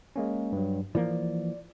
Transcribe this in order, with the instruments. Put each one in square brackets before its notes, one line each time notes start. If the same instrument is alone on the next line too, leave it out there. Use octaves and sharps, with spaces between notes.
[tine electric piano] G#3 A#3 C#4
G2 F#3
[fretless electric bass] E3 F3 A#3 [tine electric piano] D5